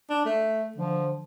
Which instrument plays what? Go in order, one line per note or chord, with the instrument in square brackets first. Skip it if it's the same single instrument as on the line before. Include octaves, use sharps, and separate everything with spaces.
[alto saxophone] D4
A3
[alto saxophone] D3 [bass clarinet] F3